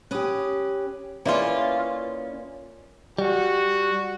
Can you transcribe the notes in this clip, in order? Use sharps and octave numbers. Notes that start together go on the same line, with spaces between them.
C#4 G4 B4 D#6
A#3 C#4 E4 F4 G#4 B4 D5 G#5
G3 F#4